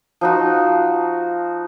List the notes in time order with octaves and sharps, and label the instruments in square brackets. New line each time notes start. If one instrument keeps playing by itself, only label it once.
[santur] F3 D#4 F#4